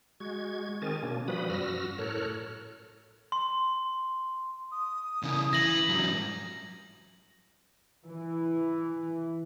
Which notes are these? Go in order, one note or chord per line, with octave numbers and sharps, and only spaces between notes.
G#3 F#4 G#6
D#3 C4 G#4 A#4 G#5 A6
B2 A#3 C#4 D4
F3 G3 F#4 B4 B5 D#6
F#2 F#4 E6 F6 A#6
A2 A4 A#4 C#5 F6 F#6
C6
D#6
C#3 E3
E3 A#6 F#7
G#2 F#3
E3